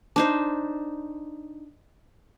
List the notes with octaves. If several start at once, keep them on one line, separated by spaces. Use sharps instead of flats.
D4 D#4 C5